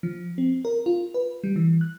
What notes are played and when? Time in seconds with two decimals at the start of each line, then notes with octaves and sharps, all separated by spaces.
0.03 F3
0.38 C4
0.65 A#4
0.86 F4
1.14 B4
1.44 G3
1.56 E3
1.81 F#6